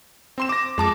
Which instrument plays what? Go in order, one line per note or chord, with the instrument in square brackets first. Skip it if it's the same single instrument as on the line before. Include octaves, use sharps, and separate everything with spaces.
[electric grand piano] C4 C6 E7
D6 A#6
[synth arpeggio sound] F2 A5 D6 [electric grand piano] G#3